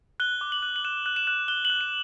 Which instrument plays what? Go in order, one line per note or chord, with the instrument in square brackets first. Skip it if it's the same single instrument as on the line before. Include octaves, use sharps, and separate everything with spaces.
[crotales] F#6 G7
D6
F#7
F#6
F#7
F#6 E7
F#6
E7
F#6
F#6 G7
F#6 F#7
E7